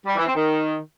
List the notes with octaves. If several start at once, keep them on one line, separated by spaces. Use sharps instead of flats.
G3
E3
C4
D#3